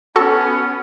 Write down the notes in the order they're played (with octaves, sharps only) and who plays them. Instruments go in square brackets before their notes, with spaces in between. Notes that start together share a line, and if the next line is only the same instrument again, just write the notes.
[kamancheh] B3 C#4 [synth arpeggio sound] F#4 A4 A5